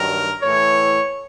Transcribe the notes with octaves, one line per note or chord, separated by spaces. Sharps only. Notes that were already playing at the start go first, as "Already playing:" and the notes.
Already playing: G2 D#3 F#3 A#4
A2 E3 C#5